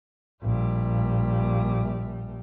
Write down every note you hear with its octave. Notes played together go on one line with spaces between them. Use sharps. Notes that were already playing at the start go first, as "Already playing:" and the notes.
A#1 G3